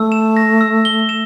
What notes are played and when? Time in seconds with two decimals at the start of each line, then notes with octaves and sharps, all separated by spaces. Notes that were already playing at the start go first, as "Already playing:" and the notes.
Already playing: A3 E6
0.12 E7
0.37 A#6
0.61 E6
0.85 G7
1.09 E7